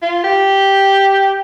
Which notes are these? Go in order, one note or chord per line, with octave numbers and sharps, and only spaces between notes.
F4
G4